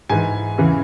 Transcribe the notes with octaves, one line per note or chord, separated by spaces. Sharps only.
G#2 E3 G#5
E2 C#3 E3